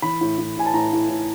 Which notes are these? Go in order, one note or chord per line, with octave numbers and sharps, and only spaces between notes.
E3 B5
A2
A2
A2 G#5
A5
A2 A#5
A2
A2